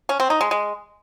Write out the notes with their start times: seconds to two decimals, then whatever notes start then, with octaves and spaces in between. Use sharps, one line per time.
0.09 C#4
0.20 C4
0.30 D#4
0.41 G#3
0.51 G#3